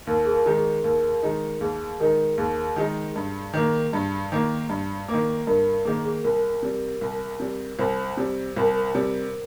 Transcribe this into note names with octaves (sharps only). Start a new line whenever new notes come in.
D#2 A#4
G#4
A#4
D#3 G#3 D#4
G#4
D#2 A#4
D#3 G#3 D#4
D#2 G#4
D#3 G#3 D#4 A#4
D#2 G#4
D#3 G#3 D#4
G2
D#3 A#3
G2
D#3 A#3
G2
A#3
D#3
G2 A#4
D#3 A#3 G#4
G#4
C2 A#4
C3 G3
C2
C3 G3
C2 C5
C3 G3
C2 A#4
C3 G3